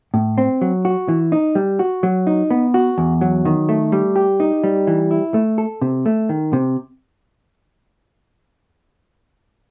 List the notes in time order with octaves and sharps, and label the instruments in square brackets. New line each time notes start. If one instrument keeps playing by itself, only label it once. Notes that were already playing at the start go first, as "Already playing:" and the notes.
[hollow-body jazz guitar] A2
C4
F#3
F#4
E3
D#4
G3
F#4
F#3
D#4
B3
F#4
E2
F#3
D#3
A3
G3
G4
D#4
G3
E3
E4
A3
A4
C3
A3
D#3
C3